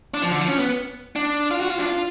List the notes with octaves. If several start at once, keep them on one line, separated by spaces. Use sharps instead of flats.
D4
F3
D3
F3
C#4
B3
D4
F4
F#4
F4
D4
F4